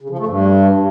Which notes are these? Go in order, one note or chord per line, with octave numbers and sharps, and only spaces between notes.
C#3
F3
A3
G2